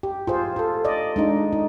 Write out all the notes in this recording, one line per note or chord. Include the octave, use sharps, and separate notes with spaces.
G4
F4 G#4 C5
F4 A4
D5 D#5
G#3 D4 D#4
D#4